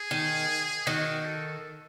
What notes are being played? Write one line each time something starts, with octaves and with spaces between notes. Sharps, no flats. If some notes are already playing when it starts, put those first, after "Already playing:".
Already playing: G#4
D#3
D#3 F#4
A4